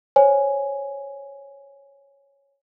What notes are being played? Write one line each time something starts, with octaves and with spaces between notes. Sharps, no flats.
C5 C#5 G#5